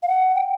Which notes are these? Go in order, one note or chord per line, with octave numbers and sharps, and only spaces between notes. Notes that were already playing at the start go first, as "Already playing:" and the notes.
F5
F#5
G5